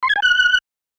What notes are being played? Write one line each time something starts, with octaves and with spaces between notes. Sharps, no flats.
C6
G#6
G#5
F#6